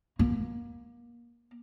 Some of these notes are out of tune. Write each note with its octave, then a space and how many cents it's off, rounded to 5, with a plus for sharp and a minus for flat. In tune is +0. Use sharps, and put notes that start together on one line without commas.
A#3 +25